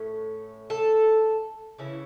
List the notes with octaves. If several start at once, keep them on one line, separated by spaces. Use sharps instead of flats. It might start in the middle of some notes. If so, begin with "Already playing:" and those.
Already playing: A2 A3 C#4
A4
C#3 E3 C#4 E4